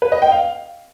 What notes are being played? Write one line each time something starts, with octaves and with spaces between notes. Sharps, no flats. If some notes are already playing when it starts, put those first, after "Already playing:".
B4
D#5
G5
F5